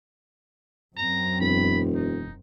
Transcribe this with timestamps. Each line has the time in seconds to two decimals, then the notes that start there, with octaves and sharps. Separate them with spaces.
0.97 F#2 C4 A#5
1.40 E1 B5
1.95 D#4